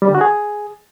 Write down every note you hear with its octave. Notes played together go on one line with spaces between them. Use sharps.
G3
D3
F#4
G#4